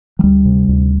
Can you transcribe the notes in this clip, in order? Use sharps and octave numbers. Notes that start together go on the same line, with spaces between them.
F#3
D2 G3
C3
D2